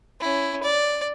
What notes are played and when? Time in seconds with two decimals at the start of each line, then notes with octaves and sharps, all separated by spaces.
0.21 C#4 E4
0.63 D5